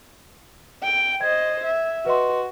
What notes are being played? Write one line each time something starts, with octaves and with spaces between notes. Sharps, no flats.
G5
C5 D#5 G#6
E5
F#4 B4 D#5 C6